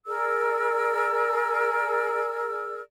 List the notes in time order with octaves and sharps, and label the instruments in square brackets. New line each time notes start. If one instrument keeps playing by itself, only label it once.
[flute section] G#4 A#4 D5 E6